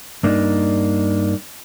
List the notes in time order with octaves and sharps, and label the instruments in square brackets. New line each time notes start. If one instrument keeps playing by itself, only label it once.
[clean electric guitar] G2 A#3 D4 D#4